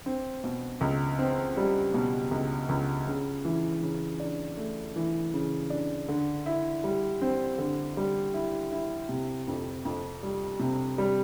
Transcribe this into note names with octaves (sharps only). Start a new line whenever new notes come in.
C4
B2
C#2
C4
G3
B2
C#2
C#2
C#3
E3
C#3
D4
A3
E3
C#3
D4
D3
E4
G3
C4
D3
G3
E4
E4
C3
F2
F2
G3
C3
G3